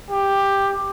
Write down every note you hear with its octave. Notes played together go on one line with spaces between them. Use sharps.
G4